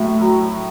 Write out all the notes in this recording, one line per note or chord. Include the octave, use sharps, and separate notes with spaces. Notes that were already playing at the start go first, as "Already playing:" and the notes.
Already playing: A2 F#3 E5
F#3